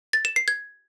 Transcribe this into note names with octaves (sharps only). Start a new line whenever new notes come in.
A6
E7
C7
G#6